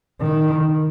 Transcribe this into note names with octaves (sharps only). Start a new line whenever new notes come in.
D#3